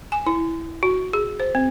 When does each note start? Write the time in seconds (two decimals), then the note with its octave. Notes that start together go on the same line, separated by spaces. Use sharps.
0.12 G#5
0.27 E4
0.83 F#4
1.13 G#4
1.40 C5
1.55 C4